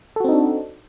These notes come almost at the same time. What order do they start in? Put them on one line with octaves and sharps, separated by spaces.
A4 F#4 C4 D#4 D4